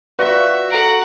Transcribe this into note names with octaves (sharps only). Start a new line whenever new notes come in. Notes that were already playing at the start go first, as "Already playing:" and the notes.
F#4 B4 D5 E5 C#6
A4 F#5 A#5 D7